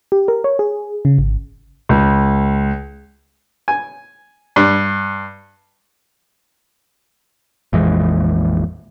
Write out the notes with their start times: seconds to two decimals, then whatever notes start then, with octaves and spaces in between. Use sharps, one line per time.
0.12 G4
0.28 A#4
0.44 C#5
0.59 G#4
1.05 C#3
1.18 G#1
1.89 C#2
3.68 G#5
4.56 G2
7.73 A#1 F2 E3 G#3